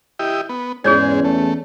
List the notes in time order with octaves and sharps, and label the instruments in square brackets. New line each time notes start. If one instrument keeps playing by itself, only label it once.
[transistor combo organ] E4 G4 D#5
B3
[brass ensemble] E2 C#4 [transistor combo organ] G#2 G#3 [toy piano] G#4 C#5 D5
[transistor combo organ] A3